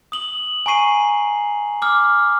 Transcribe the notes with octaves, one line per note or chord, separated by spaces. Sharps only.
D#6 F#7 G7
G#5 A#5 C#6 C7 D#7
D6 D#6 F6